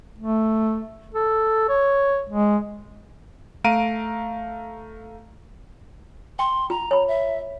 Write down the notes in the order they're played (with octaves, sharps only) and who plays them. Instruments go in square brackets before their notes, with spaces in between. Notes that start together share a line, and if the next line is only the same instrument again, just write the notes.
[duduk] A3
A4
C#5
G#3
[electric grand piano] A3 F5 A#5 D7 D#7
[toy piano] G5 [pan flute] C6
[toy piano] F4 [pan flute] A#5
[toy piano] C#5 B5
[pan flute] E5